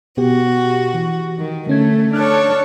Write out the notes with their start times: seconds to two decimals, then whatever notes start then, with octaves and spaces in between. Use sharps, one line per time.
0.17 B2 B3 F#4 G4
0.94 E3
1.37 D#3
1.67 D3 A3 C#4 G#6
2.13 D4 A4 C#5 F6 F#6